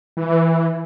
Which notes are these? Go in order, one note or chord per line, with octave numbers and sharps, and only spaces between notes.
E3